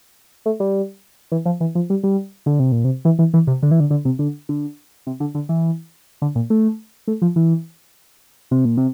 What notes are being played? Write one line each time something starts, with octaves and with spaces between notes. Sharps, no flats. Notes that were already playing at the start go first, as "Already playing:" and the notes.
A3
G3
E3
F3
E3
F3
G3
G3
D3
C3
A#2
C3
E3
E3
E3
C3
D3
E3
D3
D3
C3
D3
D3
C3
D3
D3
E3
D3
A#2
A3
A3
F3
E3
C3
A#2
C3